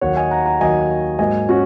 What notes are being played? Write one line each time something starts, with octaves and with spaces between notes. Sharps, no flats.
D#2 D#3 F#3 C#5 F#5
D#5 G#5
F#5 A#5
F#5 A#5
D#2 D#3 F#3 D#5 G#5
G#2 F#3 A#3 D#5 G#5
C#4 F#4